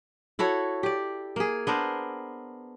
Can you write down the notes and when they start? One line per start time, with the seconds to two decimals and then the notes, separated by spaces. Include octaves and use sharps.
0.39 E4 F#4 A4 C#5
0.83 G4 D5
1.36 A#3 G#4
1.67 B3 D4 A#4 C5